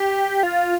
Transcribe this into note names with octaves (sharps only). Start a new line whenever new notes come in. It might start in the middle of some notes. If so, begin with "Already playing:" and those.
Already playing: G4
F4